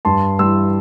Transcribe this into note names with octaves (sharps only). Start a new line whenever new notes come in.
G2 A5 C6
E3 G3 C6 E6